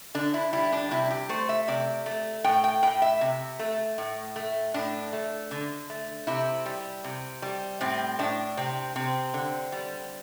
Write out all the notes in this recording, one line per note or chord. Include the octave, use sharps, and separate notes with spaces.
D3 D4
E4
G3 E4
D4
C3 E4
G4
A3 C5
E5
C3 D5
A3
A2 G5
G5
A2 G5
E5
C3
A3
A2
A3
A2 D4
A3
D3
A3
C3 E4
G3
C3
G3
A2 C4
A2 D4
C3 C4
C3 C4
D3
G3